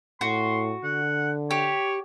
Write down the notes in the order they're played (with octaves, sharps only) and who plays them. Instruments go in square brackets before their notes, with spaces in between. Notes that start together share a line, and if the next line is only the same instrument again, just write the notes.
[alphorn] A2 [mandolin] F#4 [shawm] C6
[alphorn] D3 [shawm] F#5
[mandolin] G4 [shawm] C#5